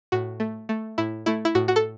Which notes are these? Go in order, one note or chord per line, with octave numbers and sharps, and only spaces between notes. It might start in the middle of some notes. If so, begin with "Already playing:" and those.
A2 F#4
A3
A3
A2 E4
A3 E4
E4
A2 F#4
F#4
A4